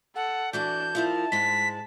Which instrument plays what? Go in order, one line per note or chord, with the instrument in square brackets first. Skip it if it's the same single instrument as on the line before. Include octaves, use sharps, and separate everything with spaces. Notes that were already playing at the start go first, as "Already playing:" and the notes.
[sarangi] A4 [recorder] F#5
[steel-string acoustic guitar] E3 F#4 A5 [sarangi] D4 [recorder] G6
[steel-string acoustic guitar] F3 E4 A#4 [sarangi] A5
[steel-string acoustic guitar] G#2 G#3 [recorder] B6